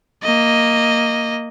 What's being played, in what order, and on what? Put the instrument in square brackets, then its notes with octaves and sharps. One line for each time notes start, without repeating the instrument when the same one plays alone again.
[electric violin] A#3 D#5